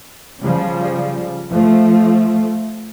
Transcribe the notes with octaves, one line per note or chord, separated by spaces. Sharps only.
C#3 F3 G3
F3 A3